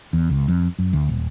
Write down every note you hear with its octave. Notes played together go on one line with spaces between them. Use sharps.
E2
C#2
F2
F#2
D2
D#1